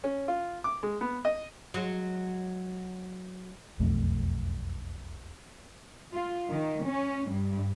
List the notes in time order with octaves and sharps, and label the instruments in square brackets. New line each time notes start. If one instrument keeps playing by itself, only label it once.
[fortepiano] C#4
F4
D6
G#3
B3
D#5
[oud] F#3 G#3
[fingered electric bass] E1 B1 F2 A3
[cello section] F4
D#3
C#4
G2